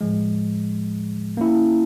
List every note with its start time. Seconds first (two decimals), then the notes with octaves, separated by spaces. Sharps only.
0.01 A2 F3 G#3
1.37 A#3 C#4 E4